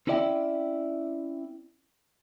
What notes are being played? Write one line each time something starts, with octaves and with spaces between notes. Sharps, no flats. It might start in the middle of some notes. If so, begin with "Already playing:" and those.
C4 C#4 E4 D5 E5 G5